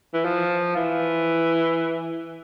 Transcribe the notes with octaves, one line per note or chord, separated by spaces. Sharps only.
E3
F3
E3